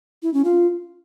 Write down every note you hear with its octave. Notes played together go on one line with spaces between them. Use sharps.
E4
C#4
F4